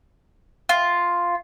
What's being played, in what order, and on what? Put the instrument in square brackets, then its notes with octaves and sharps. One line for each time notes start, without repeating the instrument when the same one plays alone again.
[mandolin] F4